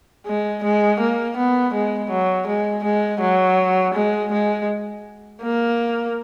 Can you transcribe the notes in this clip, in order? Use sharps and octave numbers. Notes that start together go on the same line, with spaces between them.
G#3
G#3
A#3
B3
G#3
F#3
G#3
G#3
F#3
G#3
G#3
A#3